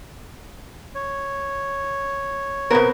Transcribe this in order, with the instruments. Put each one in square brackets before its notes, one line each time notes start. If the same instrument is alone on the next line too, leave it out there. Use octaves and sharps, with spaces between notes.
[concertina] C#5
[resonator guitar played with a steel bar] B2 A#4 [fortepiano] B3 C4